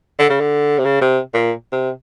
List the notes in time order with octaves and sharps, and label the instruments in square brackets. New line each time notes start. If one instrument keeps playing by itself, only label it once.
[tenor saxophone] D3
C#3
D3
C3
C#3
C3
A#2
C3